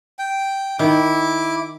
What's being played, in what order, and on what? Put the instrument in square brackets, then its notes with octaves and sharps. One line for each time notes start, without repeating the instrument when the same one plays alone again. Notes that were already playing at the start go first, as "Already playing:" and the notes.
[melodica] G5
[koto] D#3 [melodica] E4 D6